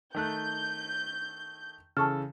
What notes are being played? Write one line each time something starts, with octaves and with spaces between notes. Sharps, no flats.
D#3 A3 F#6 G6
C#3 E3 A4 A5 C#6 F6